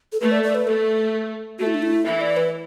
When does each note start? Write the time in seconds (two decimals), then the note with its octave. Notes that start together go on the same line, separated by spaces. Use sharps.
0.12 A4
0.20 A3 B4
0.31 D5
0.43 D5
0.55 B4
0.66 A3 A4
1.59 A3 F#4
1.66 E4
1.74 D4
1.82 E4
2.05 E3 E5
2.21 D5
2.37 B4